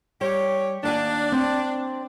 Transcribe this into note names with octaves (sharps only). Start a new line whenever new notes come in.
G3 G4 C#5
D#2 D4 D5 G#5
C4